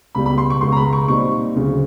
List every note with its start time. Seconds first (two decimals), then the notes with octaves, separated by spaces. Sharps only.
0.15 C#2 B2 G3 B5
0.26 B5
0.38 C6
0.50 C#6
0.61 C#2 B2 G#3 B3 C6
0.72 A#5
0.77 B5
0.93 C#6
1.08 A#2 G3 C4 D#4 C#6
1.55 D2 C#3 F#3